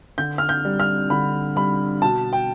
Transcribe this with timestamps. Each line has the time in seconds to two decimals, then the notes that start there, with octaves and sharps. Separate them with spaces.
0.18 D3 G6
0.38 F6
0.49 G6
0.65 G3
0.80 F6
1.10 D3 B5
1.56 G3 B5
2.02 B2 A5
2.33 G5